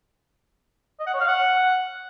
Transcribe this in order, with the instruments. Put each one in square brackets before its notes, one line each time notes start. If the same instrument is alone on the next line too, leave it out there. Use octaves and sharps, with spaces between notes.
[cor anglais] D#5
F#5
C#5
F5
F#5